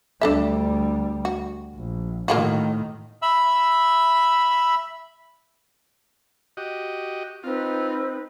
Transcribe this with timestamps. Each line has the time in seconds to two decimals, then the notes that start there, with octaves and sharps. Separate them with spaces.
0.21 D2 G3 D4 A4 E5
1.25 F#4
1.75 A#1
2.28 A2 D#3 A#3 F4 F#4
3.22 E5 B5 E6
6.57 F#4 G4 D#5
7.43 C4 D#4 F4 B4